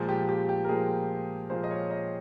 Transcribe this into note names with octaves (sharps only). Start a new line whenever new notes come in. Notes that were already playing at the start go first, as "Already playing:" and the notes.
Already playing: A#2 F3 G#3
G4
G4
G4
A#4
A#2 F3 G#3 G#4
A#2 F3 G#3 C5
D#5
C#5
D#5